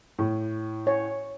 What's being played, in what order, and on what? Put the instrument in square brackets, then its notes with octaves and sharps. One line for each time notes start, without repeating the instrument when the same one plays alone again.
[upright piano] A2
[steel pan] C#5